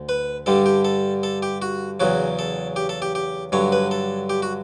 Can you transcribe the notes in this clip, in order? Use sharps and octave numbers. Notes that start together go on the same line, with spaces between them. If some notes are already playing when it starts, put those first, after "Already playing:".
Already playing: D2
B4
G2 D3 G3 A4
G4
A4
A4
G4
F#4
E2 C#3 F#3 F#4
A4
G4
A4
G4
G4
G2 D3 F#3 C#5
B4
A4
G4
F#4